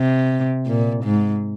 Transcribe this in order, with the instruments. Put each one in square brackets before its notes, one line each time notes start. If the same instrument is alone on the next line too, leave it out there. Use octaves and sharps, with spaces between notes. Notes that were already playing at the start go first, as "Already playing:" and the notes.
Already playing: [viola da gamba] C3
A#2
G#2